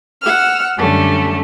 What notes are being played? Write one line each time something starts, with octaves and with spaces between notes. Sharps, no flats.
F#5 E6 F6
F#2 D3 G3 A3 C#4